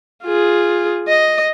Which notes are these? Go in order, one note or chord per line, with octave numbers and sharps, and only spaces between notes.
F4 G#4
D#5